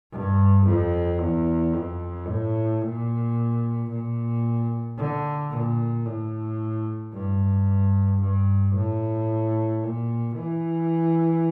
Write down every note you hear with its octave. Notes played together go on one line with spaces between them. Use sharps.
G2
F2
E2
F2
A2
A#2
A#2
D3
A#2
A2
G2
G2
A2
A#2
E3